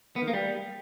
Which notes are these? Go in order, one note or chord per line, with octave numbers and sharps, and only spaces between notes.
B3
D#3
A#3
G3